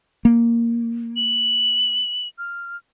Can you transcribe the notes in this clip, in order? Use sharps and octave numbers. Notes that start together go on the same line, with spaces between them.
A#3
F#7
F6